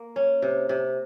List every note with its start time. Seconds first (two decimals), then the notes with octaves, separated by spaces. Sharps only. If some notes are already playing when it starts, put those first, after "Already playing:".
Already playing: A#3
0.16 C#4
0.42 C3
0.69 C3